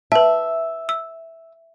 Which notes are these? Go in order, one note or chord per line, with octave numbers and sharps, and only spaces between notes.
B4 E5 A5
E6